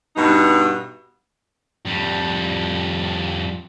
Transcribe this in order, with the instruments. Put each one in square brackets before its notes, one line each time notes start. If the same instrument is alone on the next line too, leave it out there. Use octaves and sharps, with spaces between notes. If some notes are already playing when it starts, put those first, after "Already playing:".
[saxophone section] G2 B2 D#4
[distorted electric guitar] F2 G3